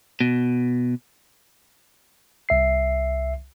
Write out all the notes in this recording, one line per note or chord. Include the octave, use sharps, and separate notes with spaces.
B2
C2 E5 C7